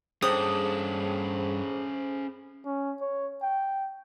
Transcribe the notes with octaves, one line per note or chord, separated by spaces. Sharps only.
G2 C#4 G#4 A4 C5 D#6 F#7
C#4
C#5
G5